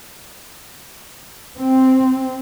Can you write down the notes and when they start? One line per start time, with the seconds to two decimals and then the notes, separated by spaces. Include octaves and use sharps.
1.58 C4